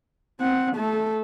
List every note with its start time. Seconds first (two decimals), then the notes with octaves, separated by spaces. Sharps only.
0.41 C4 F#5
0.76 A3 A4